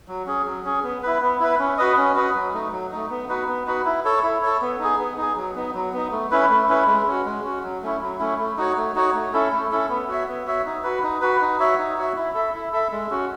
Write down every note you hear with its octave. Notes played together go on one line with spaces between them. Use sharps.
F#3
C#4 G#4
F#3
C#4 G#4
B3
E4 B4
B3
E4 B4
C#4
F#4 B4 D#5
C#4
F#4 B4 D#5
F#3
A3 D#4
F#3
A3 D#4
B3
D#4 F#4 B4
B3
D#4 F#4 B4
E4
A4 C#5
E4
A4 C#5
B3
D#4 G#4
B3
D#4 G#4
F#3
B3 D#4
F#3
B3 D#4
A3
C#4 E4 B4
A3
C#4 E4 B4
G#3
C#4 F#4
G#3
C#4 F#4
F#3
A3 C#4 E4
F#3
A3 C#4 E4
A3
D#4 F#4 C#5
A3
D#4 F#4 C#5
A3
C#4 E4 A4
A3
C#4 E4 A4
B3
F#4 C#5 E5
B3
F#4 C#5 E5
D#4
F#4 B4
D#4
F#4 B4
D#4
F#4 C#5 E5
D#4
F#4 C#5 E5
E4
A4 E5
E4
A4 E5
G#3
C#4 F#4